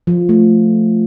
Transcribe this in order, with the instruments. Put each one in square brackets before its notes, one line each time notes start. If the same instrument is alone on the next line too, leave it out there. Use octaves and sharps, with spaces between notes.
[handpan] F3
A3